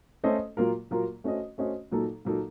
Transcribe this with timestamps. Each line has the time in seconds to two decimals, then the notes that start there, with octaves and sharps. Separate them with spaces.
0.24 A3 C#4 A4 C5 D#5
0.57 A#2 F#3 A#3 F4 A#4
0.91 A#2 F#3 A#3 F4 A#4
1.24 A3 C#4 F#4 C5 D#5
1.58 A3 C#4 F#4 C5 D#5
1.91 A#2 F#3 A#3 D#4 A4
2.25 A#2 F#3 A#3 D#4 A4